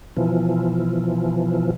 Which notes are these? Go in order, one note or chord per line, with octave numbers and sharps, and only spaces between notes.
B2 E3 F3